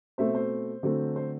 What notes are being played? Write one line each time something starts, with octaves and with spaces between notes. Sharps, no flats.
B2 A3 C4 C5 E5
C5
D3 F#3 A3 C4
C5